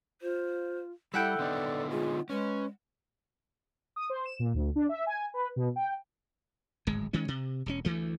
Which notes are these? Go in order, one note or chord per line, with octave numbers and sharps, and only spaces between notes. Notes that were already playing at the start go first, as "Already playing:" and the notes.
F4 C5
G3 E4 A4 E5 F#5 G5
D3 B3 D#4 D5
G#3 F4
G#3 C#4 B4
D#6
C5
E7
A#2
D2
D4
E5
G#5
B4
B2
G5
D1 G#1 G#3
D#3 G#3 C#4
C3
E1 C#3 C#4
D2 E3 A3